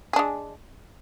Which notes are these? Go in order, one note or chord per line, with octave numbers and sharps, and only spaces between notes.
G#3 D4 G#4